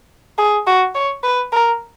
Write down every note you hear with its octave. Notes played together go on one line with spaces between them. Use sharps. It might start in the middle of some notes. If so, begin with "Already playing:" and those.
G#4
F#4
C#5
B4
A#4